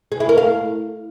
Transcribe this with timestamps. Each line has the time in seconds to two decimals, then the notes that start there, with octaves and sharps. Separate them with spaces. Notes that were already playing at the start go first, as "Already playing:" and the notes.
0.12 G#4
0.20 E4
0.29 A#4
0.38 F5